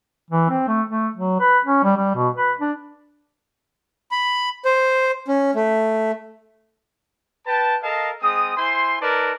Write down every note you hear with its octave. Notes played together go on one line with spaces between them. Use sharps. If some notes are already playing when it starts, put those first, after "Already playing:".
E3
C4
A3
A3
F#3
B4
C#4
G3
G3
B2
B4
D4
B5
C5
C#4
A3
B4 G5 A5
A4 A#4 D#5 F5 A5
G#3 C4 D#6
E4 C5 G#5 C6
D#4 A#4 B4 D5 A5